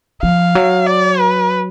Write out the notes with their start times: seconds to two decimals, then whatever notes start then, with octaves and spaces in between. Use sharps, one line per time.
0.22 F3 F5
0.55 F#3
0.87 D5
1.19 B4